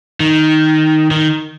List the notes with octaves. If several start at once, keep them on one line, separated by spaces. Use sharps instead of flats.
D#3
D#3